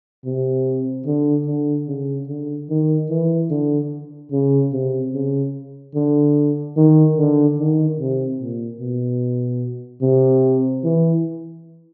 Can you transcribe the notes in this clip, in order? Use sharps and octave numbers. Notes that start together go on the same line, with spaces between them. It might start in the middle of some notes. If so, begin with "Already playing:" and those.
C3
D3
D3
C#3
D3
D#3
E3
D3
C#3
C3
C#3
D3
D#3
D3
D#3
C3
A#2
B2
C3
E3